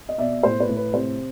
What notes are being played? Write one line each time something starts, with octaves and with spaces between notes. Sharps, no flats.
D#5
B2 D5 E5
A2 C5
B4 C#5
A2
B4
C3 C5